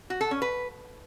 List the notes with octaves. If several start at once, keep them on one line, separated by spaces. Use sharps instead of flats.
F#4
A4
C#4
B4